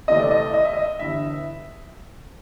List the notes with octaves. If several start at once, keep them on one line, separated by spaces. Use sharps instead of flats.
C2 C3 E3 A3 C4 D#5
D5
D#5
D#5
E5
D#5
G1 G2 E3 E5